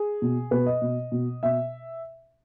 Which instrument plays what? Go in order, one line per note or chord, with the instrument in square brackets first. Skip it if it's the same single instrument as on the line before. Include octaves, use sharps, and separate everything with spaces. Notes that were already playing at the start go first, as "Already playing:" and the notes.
Already playing: [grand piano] G#4
B2
B2 B4
D#5
B2
B2
B2 E5